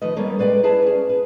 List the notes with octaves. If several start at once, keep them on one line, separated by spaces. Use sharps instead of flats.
D#3 F3 A3 B4 D#5
G3 A#3 B3 C#4 A4
G#3 B4 D5 F5 G5
E4 G#4 B4 E5 A5
C#4 G#4
B4